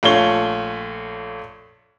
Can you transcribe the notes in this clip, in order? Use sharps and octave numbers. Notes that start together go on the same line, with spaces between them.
A#1 A3 F4 C#5 G7